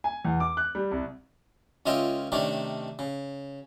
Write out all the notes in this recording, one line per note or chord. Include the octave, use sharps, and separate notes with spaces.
G#5
E2
D6
F#6
G3
C2
C#2 C#4 F4 D#5 E5 G5
C3 D#3 A3 C#4 D4
C#3